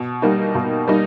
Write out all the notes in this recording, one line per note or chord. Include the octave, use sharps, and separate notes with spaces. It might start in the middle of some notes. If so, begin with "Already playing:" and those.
Already playing: B2
G3 A#3 D#4
B2
G3 A#3 D#4